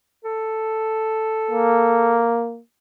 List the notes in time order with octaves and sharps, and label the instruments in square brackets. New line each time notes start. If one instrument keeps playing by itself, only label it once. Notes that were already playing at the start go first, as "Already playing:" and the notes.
[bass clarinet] A4
[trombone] A#3